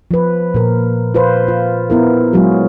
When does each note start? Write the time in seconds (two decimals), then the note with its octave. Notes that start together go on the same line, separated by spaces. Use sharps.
0.11 F3 B4
0.54 A#2 A#4
1.14 F4 B4 C5
1.48 F4
1.90 B3 E4 A#4
2.33 F#3 G#3 F4 F#4 G#4